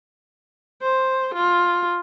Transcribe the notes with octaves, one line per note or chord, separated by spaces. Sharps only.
C5
F4